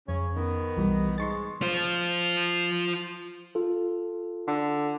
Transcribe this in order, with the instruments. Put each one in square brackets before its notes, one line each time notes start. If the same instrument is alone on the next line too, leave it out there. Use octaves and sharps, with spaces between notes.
[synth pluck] F2 [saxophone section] C#3 C#4 C#5
[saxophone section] D#3 B3
[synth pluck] B1 E3 G3
[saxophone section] G#2 G#3 [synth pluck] C6 C#6 A6
[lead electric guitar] F4 C5
[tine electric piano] F4 A4
[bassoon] D3